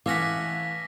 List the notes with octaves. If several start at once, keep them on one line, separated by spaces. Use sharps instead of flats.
E3 A3 C#4 F5 F#5 D6 A#6 B6